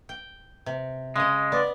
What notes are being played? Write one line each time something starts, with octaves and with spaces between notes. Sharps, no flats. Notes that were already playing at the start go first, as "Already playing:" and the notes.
G5
C3
C#3 G#3 D#5
B3 D5